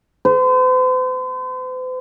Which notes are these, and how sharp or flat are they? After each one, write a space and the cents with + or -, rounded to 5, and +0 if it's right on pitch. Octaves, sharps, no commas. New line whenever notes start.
C5 -45